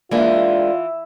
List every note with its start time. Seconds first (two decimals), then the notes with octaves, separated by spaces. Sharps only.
0.11 E3 G#3 A#3 D4 F4 D5